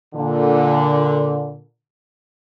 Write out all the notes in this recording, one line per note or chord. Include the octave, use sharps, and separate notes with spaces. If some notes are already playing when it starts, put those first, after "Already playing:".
A#2 D3